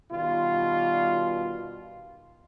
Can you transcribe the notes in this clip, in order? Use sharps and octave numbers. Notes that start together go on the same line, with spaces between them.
B2 D#3 G3 F4